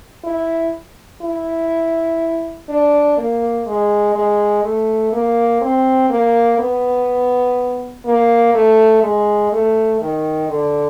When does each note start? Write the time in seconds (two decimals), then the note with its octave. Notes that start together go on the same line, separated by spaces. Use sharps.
0.24 E4
1.22 E4
2.69 D4
3.17 A#3
3.66 G#3
4.15 G#3
4.64 A3
5.12 A#3
5.61 C4
6.10 A#3
6.59 B3
8.05 A#3
8.54 A3
9.03 G#3
9.52 A3
10.01 D#3
10.49 D3